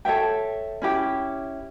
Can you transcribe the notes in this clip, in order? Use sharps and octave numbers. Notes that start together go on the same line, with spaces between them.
A4 C#5 E5 G5
C#4 E4 G4